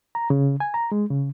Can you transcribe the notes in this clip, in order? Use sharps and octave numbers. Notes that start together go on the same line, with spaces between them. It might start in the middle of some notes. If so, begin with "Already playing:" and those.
A#5
C#3
G#5
A#5
G#3
C#3